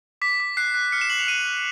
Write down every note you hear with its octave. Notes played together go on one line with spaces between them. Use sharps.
D6 B6
D6
F#6 C7
F#6
F6 C#7
E7
C#6 F#7
F7
F6 D#7
F6